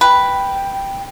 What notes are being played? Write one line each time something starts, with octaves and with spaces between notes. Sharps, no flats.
B4 G5